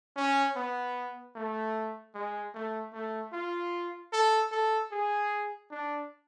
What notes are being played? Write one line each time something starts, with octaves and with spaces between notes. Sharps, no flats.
C#4
B3
A3
G#3
A3
A3
F4
A4
A4
G#4
D4